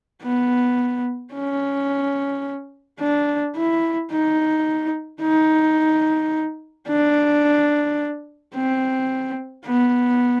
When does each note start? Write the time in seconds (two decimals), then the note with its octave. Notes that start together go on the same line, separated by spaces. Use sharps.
0.23 B3
1.34 C#4
3.00 D4
3.56 E4
4.11 D#4
5.22 D#4
6.88 D4
8.55 C4
9.65 B3